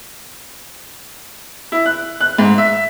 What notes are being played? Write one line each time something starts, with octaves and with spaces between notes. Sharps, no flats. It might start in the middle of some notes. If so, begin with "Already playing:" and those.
E4
F#6
F#6
G#2
E5